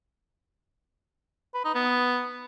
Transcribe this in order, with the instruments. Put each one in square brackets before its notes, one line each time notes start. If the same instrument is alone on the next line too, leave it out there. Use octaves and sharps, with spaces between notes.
[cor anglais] B4
D#4
B3